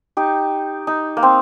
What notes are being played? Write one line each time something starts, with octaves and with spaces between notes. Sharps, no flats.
D#4 G4
D#4
A#3
C4